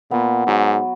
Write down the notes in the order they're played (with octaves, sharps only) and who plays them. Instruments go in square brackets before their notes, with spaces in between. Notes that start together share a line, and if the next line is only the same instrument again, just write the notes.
[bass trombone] A#2 [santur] B3
[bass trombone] G#2 [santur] F#3